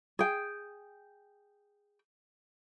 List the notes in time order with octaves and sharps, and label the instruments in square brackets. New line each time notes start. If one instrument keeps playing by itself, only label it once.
[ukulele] G#4 G5